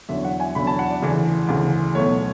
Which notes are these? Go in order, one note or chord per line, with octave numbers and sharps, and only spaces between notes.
E2 D3 F#3 C#4 E5
F#5
G#5
E2 D3 F#3 C#4 B5
A5
F#5
D5
D2 C#3 E3
D2 C#3 E3
B1 B2 A3 C#5